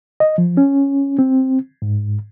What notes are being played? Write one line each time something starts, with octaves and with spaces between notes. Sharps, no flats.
D#5
F3
C#4
C4
G#2